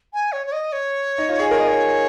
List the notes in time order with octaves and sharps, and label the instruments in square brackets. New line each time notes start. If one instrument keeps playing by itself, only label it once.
[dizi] G#5
C#5
C#5
D#5
C#5
[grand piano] D#4
F4
G#4
[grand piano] A#4 [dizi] C#5
[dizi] D#5
C#5